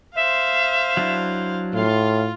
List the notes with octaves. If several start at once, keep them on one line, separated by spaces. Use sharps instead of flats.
C5 E5 F5
F#3 D4 E4
A2 F4 F5